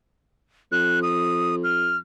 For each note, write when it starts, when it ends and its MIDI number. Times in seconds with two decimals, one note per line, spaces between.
0.72 1.99 41
0.72 1.00 90
1.02 1.56 87
1.64 1.97 89